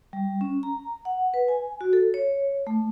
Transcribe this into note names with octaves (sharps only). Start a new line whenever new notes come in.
G3
C#4
A#5
F#5
B4
G#5
F#4
A4
C#5
A3